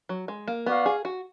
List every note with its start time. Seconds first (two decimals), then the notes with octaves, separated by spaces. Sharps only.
0.09 F#3
0.28 G#3
0.48 A#3
0.66 B3 F#4 D5 F5
0.86 G#4
1.05 F#4